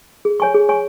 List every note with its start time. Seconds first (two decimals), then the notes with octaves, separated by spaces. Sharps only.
0.25 G#4
0.40 C#5 G#5 C#6
0.54 G#4
0.69 C#5 G#5 C#6